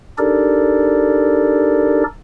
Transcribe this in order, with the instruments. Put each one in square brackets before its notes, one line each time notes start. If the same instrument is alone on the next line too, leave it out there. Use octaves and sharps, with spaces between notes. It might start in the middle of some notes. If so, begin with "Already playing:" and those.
[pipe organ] D4 D#4 G4 A4 A#4 D5